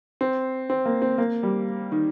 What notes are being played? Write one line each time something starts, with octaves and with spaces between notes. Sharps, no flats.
C4
C4
A#3
C4
A#3
G3
D#3